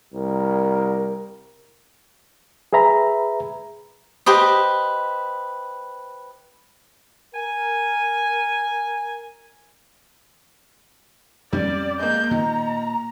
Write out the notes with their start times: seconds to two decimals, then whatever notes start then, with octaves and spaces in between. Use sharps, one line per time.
0.14 C2 A#4
2.73 G#4 B4 E5 A#5 B5
4.26 G4 B4 C5 D#5
7.35 A#4 G#5
11.53 F2 G3 B3 C#4 D5
11.99 G#3 A#3 G6
12.31 A#2 D#3 A#5